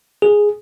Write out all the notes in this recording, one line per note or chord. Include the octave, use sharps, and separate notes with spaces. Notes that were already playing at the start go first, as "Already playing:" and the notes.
G#4